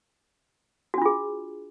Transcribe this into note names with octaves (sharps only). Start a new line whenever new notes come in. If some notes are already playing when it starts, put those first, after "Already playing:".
D4 F4 F#4 G#4